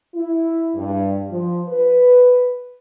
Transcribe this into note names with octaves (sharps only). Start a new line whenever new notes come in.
E4
G2
F3
B4